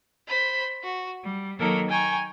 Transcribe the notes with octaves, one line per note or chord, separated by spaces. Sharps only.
C5 B5
F#4
G3
D#3 F#3 A#3 A4 A#4
G5 G#5 A#5 C#6